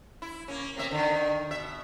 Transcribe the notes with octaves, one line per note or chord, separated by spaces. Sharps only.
E4
A#3 C#4
C3 A#3 E5
D3 D#3
B2 E5